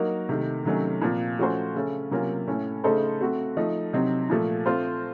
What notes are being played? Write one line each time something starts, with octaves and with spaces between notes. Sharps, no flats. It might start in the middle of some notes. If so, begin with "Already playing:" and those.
Already playing: F#3 A#3 D#4 F#4 A#4
C3 D#3 A3
C3 D#3 F#3 A3 C#4
A#2 F3 C4
F3 A3 C#4 F#4 C5
C#3 A3 C#4
C3 F#3 A#3 C#4 F4
A2 A3 C#4
C#3 A3 D#4 A4 C5
A3 C4 F#4
F3 A3 D#4
C3 F#3 C4 D#4
A#2 F3 A3
A3 C4 F4 C5